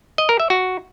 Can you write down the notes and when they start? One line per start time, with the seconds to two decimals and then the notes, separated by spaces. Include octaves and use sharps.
0.18 D#5
0.29 A#4
0.40 E5
0.50 F#4